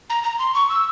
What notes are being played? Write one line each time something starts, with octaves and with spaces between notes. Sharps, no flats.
A#5
A#5
C6
C#6
E6